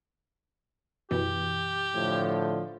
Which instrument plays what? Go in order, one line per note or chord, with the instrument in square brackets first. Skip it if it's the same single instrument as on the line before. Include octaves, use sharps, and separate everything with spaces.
[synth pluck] F#2 B2 E3 [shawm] G4
[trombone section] A2 D3 F3